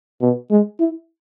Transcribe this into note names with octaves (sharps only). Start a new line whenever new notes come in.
B2
G#3
E4